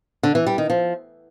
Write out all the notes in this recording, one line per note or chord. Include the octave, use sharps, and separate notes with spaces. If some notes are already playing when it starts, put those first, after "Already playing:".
D3
E3
G3
D#3
F3